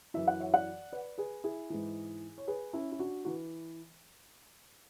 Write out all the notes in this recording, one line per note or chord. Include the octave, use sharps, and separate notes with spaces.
F#2 E3 E5
F#5
C#5 E5
D5 F#5
B4 D5
G#4 B4
E4 G#4
G#2 E3
C#5
G#4 B4
C#4 E4
E4
D4 F#4
E3 F#4